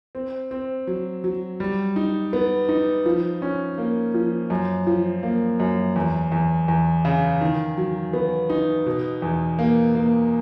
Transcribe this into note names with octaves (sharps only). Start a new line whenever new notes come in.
C4
C4
F#3
F#3
G3
D#4
B3
D#4
F3
C#4
A#3
F3
F#2
F3
A#3
F#2
E2
E2
E2
C#3
D#3
F#3
B3
D#4
B2
E2
A#3
A#3